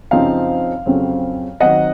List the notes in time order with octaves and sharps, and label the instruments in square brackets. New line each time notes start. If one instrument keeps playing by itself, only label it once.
[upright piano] F#2 C#3 F3 C4 D#4 F5
F2 C#3 F#3 C4
D#3 F#3 C4 D#5 F#5